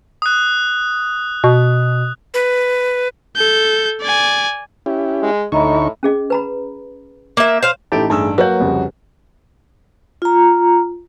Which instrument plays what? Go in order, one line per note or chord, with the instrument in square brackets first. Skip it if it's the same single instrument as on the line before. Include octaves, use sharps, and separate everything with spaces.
[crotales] D#6 F#6
[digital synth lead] B2
[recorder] B4
[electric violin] A4 G6
D5 G#5
[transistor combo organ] C#4 E4 G4
[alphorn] G#3
[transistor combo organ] D2 D#4 C#6 [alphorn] A2 [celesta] D#5 A#5 B5
[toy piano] C#4 G#4 D#5
B4 A#5 B5
[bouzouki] A#3 E5
[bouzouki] C5 F5 [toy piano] C#5
[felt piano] A1 D#4 D7 [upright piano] A3 G4 [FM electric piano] E4 A5
[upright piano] G2 E6 [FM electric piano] A3 G#4 A4 [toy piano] A5
[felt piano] F#3 [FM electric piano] A#3 [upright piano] F#4 [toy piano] B4 C#5
[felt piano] C2 F2 C#3
[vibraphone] F4 A#5